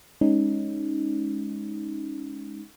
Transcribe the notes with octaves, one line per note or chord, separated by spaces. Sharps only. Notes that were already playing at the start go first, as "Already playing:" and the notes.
G#3 C#4 D#4